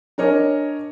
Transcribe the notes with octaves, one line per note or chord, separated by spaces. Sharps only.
D4 A#4 C#5 D#5 G#5